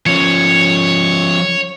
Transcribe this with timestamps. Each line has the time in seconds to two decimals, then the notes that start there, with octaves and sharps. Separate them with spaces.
0.06 F3 C#4 C#5